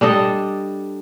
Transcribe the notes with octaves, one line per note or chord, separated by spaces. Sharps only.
G3 D4 A4 D#5